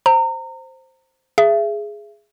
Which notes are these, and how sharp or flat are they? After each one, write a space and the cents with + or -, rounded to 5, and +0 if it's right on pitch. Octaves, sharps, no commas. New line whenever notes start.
C5 +0 A#5 -30
G#4 +0 E5 +30